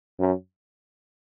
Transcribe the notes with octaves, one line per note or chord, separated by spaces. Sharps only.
F#2